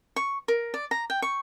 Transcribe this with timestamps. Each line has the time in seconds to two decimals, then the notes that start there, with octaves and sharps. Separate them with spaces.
0.16 C#6
0.48 A#4
0.74 D5
0.91 A#5
1.10 G5
1.22 C#6